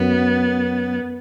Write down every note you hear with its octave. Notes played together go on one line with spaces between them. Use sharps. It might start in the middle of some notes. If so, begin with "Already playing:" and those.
Already playing: F#2 B3